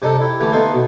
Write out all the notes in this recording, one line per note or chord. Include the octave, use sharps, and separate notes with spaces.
C3 D4 D#4 A4
E4 G4
D3 E3 G3 A3
B3 D#4 A4 C5 E5 F5
B2